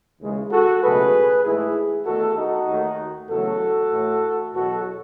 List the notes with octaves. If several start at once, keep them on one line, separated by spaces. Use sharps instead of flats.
D#2 C#3 E3 G#3
F#4 A4
C#2 B2 F#3 A3 G#4 B4
G#2 E3 A3 E4 G#4
E2 D#3 A3 F#4 A4
D#4 F#4
D#2 D#3 A3
E2 C#3 F#3 A3 F#4 A4
A2 E3 A3
E2 B2 F#3 F#4 A4